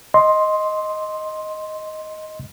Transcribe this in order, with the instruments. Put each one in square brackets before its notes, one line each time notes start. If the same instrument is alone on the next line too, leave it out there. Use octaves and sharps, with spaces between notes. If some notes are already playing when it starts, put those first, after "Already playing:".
[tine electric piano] D#5 C6